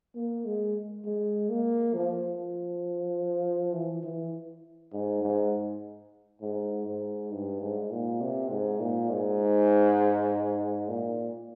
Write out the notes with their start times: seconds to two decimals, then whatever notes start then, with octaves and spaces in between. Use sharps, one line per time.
0.15 A#3
0.45 G#3
1.04 G#3
1.49 A#3
1.94 F3
3.73 E3
4.03 E3
4.92 G#2
5.22 G#2
6.41 G#2
6.86 G#2
7.31 G2
7.61 G#2
7.90 A#2
8.20 C3
8.50 G#2
8.80 A#2
9.10 G#2
10.88 A#2